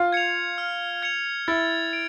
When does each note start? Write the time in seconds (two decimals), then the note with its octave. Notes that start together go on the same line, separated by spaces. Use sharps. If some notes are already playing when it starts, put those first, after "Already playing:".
Already playing: F4
0.13 G#6 C#7 F7
0.58 F6
1.02 G#6 C#7 F7
1.48 E4 A6
1.93 D7